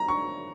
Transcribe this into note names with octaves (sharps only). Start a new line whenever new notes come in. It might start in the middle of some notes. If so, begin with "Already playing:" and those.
Already playing: A#5
C#6